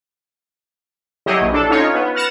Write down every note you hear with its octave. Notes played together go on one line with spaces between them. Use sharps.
F#3 E4 G4 G#4 C#5 D#5
A#1
D4 A4 A5
C#4 D#4 F4 C#5
B3
F6 F#6 A6 A#6 C#7 E7